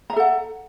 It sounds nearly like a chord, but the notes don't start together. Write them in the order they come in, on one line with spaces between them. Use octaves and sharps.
A#5 E5 A4 F#5